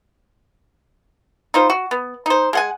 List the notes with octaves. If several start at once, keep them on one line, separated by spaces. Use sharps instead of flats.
D#4 F4 C5
F#4
B3
D#4 C5
G#3 F#5 G#5